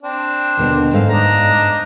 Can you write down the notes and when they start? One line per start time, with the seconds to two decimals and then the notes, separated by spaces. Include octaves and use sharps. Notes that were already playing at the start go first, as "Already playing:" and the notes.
0.03 C4 D4
0.57 D#2 B2 D3
0.93 G#2 A4 F5
1.09 D4 D#4 A#5